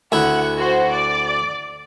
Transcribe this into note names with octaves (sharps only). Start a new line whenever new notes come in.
D2 E4 F#5
F#4 C5
D5